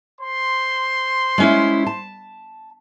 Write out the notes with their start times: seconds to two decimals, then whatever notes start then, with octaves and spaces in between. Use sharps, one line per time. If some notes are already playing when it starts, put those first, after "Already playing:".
0.19 C5 C6
1.38 G#3 C#4 E4
1.86 A5